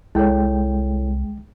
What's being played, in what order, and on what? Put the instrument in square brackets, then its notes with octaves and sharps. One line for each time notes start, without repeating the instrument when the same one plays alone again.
[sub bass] C2 [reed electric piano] G#3 G5 [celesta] E4 A4 C#5